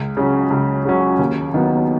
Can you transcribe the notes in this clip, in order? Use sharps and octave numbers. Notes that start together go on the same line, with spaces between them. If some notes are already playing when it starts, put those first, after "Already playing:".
Already playing: C#2
C#3 F#3 C#4
C#2
C#3 F#3 C#4
D#2
D#3 F#3 B3